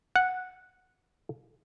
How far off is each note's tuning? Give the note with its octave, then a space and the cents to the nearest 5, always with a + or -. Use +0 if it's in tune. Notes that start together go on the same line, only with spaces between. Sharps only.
F#5 -5